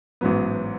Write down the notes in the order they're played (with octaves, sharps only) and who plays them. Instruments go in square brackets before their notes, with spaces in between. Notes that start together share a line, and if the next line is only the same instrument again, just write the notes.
[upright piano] A1 G#2 F#3 B3